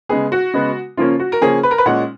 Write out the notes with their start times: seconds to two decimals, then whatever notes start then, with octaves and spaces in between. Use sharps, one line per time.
0.09 C#3 G#3 B3 G#4
0.32 F#4
0.54 C#3 G#3 B3
0.97 C#3 F3 A#3 C#4 F4
1.19 F#4
1.32 A#4
1.41 C#3 F3 A#3 C#4 G#4
1.63 B4
1.71 A#4
1.78 B4
1.86 A#2 G#3 C#4 F#5